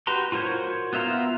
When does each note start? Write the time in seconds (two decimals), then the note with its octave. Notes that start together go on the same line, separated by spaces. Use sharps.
0.07 F#4 G4 B4 A#5 C6
0.32 F4 F#4 A#4 C5 C#5
0.93 B3 F4 E5 F5 A#5